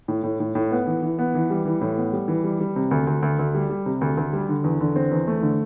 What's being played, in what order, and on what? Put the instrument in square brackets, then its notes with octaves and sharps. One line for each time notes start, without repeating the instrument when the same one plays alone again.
[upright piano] A2
A2
A2
A2
B3
E3
E3
B3
E3
G3
E3
A2
B3
G3
E3
G3
G3
C3
D2
D2
D2
D2
G3
G3
C3
D2
D2
G3
D3
E2
D3
C4
E2
A3
D3